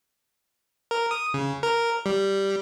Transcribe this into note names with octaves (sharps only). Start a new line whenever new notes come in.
A#4
D#6
C#3
A#4
G3